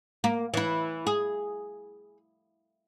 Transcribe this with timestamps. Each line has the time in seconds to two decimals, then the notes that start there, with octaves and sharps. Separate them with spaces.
0.24 A#3
0.54 E3 E4
1.07 G#4